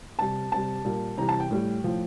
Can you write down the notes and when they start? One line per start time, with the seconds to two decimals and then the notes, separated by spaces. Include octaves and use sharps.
0.19 C3 G3 A5
0.52 C3 G3 A5
0.85 A#2 G3
1.18 C3 E3 G3 A#5
1.29 A5
1.40 G5
1.51 A2 G3
1.84 A2 F3